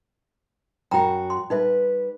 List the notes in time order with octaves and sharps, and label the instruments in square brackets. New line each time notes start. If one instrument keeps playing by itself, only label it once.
[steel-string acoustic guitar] F#2 F#4 [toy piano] G5 A#5 B5
[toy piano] C6
[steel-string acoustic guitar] G3 B4 [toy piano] D#4 E5